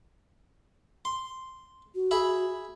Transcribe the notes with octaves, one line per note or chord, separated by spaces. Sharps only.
C6
F#4
G#4 E5 B5